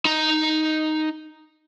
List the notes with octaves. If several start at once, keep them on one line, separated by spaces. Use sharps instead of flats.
D#4 A#5